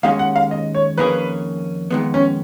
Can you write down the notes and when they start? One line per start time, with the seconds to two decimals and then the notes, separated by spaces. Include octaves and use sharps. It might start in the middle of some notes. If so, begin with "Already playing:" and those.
0.03 D#2 D#3 G#3 C#4 F5
0.19 F#5
0.36 F5
0.51 D#5
0.75 C#5
0.97 F2 D#3 A#3 C#4 G#4 B4
1.91 F2 D#3 G#3 B3
2.14 C#4